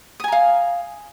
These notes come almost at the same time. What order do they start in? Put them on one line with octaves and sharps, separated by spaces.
D#6 G#5 A#5 F5